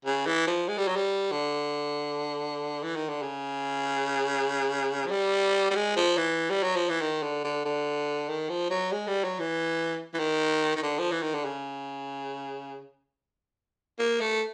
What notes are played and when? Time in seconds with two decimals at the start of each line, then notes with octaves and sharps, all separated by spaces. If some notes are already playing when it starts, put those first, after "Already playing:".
0.05 C#3
0.27 E3
0.47 F3
0.68 G#3
0.78 G3
0.88 F#3
0.96 G3
1.32 D3
2.83 E3
2.96 D#3
3.09 D3
3.22 C#3
5.07 F#3
5.11 G3
5.71 G3
5.76 G#3
5.96 F3
6.17 E3
6.50 G3
6.63 F#3
6.76 F3
6.89 E3
7.01 D#3
7.22 D3
7.44 D3
7.65 D3
8.29 D#3
8.50 F3
8.70 F#3
8.92 G#3
9.08 G3
9.24 F#3
9.40 E3
10.14 E3
10.19 D#3
10.76 D#3
10.83 D3
10.99 F3
11.12 E3
11.22 D#3
11.34 D3
11.45 C#3
13.99 A#3
14.20 A3